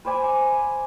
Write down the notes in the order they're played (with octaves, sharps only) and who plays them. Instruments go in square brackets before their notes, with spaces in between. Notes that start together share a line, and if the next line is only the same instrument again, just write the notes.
[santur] B4 C5 D5 G#5